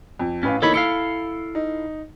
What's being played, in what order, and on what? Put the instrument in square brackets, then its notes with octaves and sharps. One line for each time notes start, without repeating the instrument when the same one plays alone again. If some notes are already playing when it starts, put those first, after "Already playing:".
[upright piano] F2
[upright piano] A1 B4 F5 [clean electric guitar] C#4
[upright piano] E3 A#3 D#4 [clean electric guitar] A4 C#5 B5
[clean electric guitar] E4 A4 F5 [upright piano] C#7
[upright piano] D#4